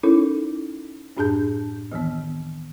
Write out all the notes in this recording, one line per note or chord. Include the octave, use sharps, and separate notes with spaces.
C#4 D#4 E4 A4 A#4 C#5
F#2 A2 D4 G#4 A5 G6
D2 D#3 E3 B3